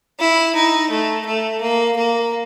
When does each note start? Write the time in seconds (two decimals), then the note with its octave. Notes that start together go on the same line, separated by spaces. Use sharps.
0.19 E4
0.55 D#4
0.90 A3
1.26 A3
1.61 A#3
1.96 A#3